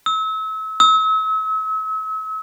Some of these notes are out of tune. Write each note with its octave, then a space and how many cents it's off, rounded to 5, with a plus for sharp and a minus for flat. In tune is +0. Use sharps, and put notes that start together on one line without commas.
E6 -35
E6 -40